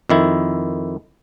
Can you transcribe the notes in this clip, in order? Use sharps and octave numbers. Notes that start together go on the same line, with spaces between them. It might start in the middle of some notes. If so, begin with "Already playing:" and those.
F2 D#3 E4